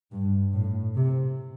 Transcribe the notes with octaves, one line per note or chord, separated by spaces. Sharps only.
G2
A2
C3